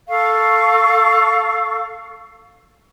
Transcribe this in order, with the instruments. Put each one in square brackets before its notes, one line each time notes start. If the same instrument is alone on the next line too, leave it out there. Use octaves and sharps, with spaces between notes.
[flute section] A4 F5 C#6